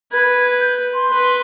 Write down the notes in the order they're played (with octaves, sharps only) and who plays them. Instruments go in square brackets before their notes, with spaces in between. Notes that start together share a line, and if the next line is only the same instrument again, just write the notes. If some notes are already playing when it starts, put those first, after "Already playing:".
[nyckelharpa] B4 [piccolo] G#6
[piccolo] G6
C6
[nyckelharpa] B4